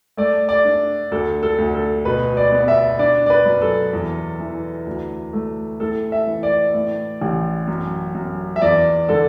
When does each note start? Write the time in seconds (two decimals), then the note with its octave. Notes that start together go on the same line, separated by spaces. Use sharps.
0.17 A3 D5
0.49 D5
0.65 D4
1.11 D2 A4
1.43 A4
1.58 D2
1.74 A4
2.05 B2 B4
2.37 D5
2.52 B3
2.68 E5
2.99 D4 D5
3.26 D5
3.30 B4
3.46 F#2
3.62 A4
3.93 E2
4.40 E3
4.87 D2
5.33 A3
5.80 A2 A4
6.12 E5
6.27 E3
6.43 D5
6.74 A2
7.22 A1
7.68 F#2
8.15 F#2
8.56 E5
8.62 E2 D5
9.09 D3 A4